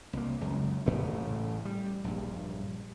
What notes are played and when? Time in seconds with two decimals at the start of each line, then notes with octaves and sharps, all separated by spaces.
0.13 C2 A#3
0.41 C#2 F#2 C#3
0.86 A1 A2 C#3 A3
1.65 G3
2.04 A#1 G2